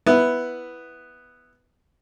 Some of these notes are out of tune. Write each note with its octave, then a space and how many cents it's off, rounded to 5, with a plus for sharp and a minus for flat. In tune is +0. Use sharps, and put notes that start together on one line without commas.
B3 +0 E4 +0